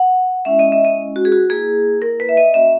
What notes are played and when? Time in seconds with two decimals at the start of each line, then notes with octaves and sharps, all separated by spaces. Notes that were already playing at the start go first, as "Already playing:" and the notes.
Already playing: F#5
0.45 G#3 C#4 E4 E5
0.59 D#5
0.72 E5
0.84 D#5
1.16 F#4
1.25 G#4
1.32 F#4
1.50 A#3 E4 G#4
2.02 A#4
2.20 B4
2.29 E5
2.37 D#5
2.54 A#3 C#4 F#4 E5